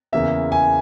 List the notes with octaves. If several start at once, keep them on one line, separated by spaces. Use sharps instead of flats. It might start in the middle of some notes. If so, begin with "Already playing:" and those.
E2 C#3 E3 A#3 E5
G#5